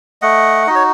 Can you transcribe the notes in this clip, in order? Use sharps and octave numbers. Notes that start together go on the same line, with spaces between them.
A3 D#5 F#5
D#4 F#4 D#5
C#5